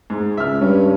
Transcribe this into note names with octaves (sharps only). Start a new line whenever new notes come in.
G#2
C#2 E5 F6
G2 C#4